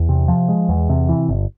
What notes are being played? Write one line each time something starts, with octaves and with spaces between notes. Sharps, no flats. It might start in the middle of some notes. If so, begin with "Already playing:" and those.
Already playing: E2
C3
F3
G#3
E2
C3
E3
G1